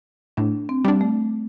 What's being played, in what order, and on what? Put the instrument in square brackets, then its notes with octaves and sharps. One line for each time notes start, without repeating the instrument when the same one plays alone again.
[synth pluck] A2 [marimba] D4
[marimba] C4
[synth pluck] G3 D4
[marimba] A3